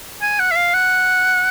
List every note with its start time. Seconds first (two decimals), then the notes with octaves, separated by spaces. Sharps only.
0.22 G#5
0.39 F#5
0.51 E5
0.56 F5
0.74 F#5